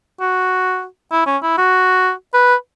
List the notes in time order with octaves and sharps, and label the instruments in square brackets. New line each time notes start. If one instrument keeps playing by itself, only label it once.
[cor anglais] F#4
E4
C#4
E4
F#4
B4